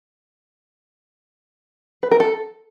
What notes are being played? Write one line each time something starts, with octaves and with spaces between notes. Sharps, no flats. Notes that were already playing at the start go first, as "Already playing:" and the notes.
B4
A#4
A4